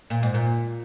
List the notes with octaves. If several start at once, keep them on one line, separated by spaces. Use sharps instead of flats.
A#2
G#2
A#2